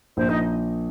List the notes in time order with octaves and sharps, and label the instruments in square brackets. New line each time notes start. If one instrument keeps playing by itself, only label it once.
[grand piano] A#1 [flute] C5
[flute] D#4